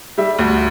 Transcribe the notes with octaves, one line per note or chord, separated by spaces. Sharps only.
G3 E5
D2